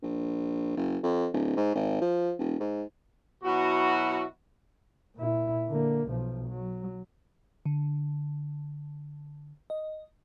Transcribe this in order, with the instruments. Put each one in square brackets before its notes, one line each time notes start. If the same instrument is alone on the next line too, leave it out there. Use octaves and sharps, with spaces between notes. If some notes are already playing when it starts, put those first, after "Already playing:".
[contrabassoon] A#1
F#1
F2
D1
G#2
G#1
F3
E1
G#2
[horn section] B2 F#3 E4 F#4
[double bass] A#2 E4
D3 A#3
B1 F3
F#3
[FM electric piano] D3
D#5